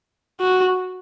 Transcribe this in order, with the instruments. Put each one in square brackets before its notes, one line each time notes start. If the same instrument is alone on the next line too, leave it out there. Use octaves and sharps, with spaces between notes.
[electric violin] F#4